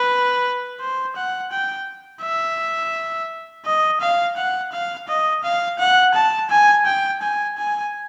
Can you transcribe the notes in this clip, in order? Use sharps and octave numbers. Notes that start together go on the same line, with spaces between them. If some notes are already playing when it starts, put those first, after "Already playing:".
Already playing: B4
C5
F#5
G5
E5
D#5
F5
F#5
F5
D#5
F5
F#5
A5
G#5
G5
G#5
G#5